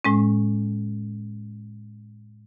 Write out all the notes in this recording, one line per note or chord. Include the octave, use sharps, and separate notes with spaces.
A2 G#3 C#4